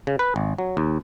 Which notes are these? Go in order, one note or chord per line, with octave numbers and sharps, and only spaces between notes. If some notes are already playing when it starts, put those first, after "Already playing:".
C#3
B4
G#1
F#3
D#2